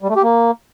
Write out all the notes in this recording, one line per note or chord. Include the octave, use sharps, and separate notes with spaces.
G3
A3
G4
A#3